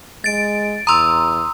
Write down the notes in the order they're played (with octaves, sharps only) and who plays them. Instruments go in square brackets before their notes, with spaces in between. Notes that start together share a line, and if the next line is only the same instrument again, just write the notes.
[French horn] G#3 [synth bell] A6 D7
[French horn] E2 [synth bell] A#5 C6 [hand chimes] D#6 E6